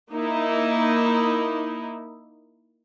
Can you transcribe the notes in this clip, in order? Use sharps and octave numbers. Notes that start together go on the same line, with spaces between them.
A#3 D#4 E4